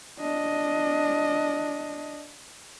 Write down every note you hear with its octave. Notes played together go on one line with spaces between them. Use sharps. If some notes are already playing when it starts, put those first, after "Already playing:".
D4 D#5